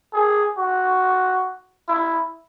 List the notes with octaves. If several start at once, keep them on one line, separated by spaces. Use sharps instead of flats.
G#4
F#4
E4